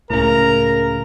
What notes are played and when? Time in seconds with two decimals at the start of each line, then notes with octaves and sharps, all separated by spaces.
0.10 C#2 A2 C#3 A#4 A#5